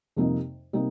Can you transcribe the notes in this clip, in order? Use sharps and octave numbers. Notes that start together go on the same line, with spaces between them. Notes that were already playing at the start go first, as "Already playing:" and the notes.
F2 C3 G3 A#3 D#4
C3 G3 A#3 D#4